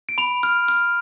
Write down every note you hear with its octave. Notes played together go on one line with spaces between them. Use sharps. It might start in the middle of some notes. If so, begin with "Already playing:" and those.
D7
B5 F7
F6
F6